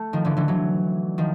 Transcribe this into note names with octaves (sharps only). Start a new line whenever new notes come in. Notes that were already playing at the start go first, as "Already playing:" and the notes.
Already playing: A3
D#3 F3
D3 E3
D3 E3
E3 F#3
D#3 F3